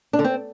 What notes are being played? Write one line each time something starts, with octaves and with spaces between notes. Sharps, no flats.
D4
D3
C4